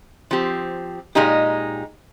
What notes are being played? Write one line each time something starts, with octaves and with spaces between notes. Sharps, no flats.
F3 C4 G4
A#2 G#3 D#4 G4